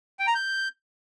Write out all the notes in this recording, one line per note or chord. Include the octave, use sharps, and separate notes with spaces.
G5
A#5
G6